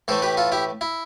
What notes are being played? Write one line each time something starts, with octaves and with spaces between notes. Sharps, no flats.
A2 E3 A3 A4 C5
G4 B4
F4 A4
E4 G4
E4